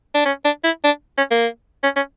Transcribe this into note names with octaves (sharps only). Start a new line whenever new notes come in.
D4
C#4
D4
E4
D4
C#4
A#3
C#4
C#4